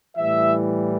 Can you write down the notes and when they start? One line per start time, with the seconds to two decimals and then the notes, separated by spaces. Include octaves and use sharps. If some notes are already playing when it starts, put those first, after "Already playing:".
0.17 A2 E3 G3 E5